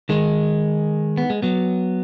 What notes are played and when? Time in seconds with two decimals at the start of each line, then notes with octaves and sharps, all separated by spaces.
0.09 D#3 G#3
1.18 B3
1.30 G#3
1.43 F#3 B3